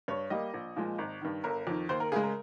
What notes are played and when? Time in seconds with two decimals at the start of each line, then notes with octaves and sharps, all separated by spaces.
0.08 G2 C#5
0.30 G3 A#3 D#5
0.54 A#1
0.76 A#2 F3 G#3
0.98 G#1
1.21 G2 D#3
1.44 G1 A#4
1.67 F2 D#3
1.89 D#2 C5
2.00 A#4
2.12 C#3 G#3 G#4
2.23 A#4